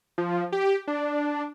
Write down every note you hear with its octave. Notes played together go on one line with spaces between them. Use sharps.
F3
G4
D4